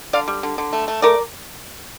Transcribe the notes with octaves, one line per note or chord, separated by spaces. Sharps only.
D3 D5 F5
G3
D3
D3
A3
A3
A3 A#4 D5